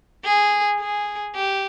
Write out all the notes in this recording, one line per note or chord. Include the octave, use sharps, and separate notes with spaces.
G#4
G#4
G4